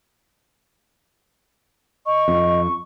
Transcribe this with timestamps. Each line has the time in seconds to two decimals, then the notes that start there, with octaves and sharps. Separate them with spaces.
2.06 D#5 C#6
2.28 F2